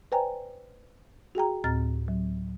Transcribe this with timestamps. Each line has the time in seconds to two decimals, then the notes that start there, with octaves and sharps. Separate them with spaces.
0.12 B4 C5 D5 G5 G#5 A#5
1.35 F#4 G#4 G5 A#5
1.64 D2 A2 C4 A#5 F6 A6
2.08 F#3